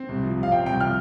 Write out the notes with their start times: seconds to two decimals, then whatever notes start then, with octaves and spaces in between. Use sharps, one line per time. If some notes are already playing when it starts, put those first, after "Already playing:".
Already playing: C4
0.09 C2
0.23 F3
0.37 C3
0.43 F5
0.51 C4 G5
0.66 C2 G5
0.80 F3 F6